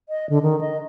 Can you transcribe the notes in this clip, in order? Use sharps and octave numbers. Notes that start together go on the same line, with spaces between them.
D#5
D3
D#3
D#5